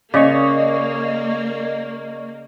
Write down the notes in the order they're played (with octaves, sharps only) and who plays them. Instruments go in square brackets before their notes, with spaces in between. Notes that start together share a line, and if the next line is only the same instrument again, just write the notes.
[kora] C#3 [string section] A#3 [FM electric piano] D5 D#5 C#6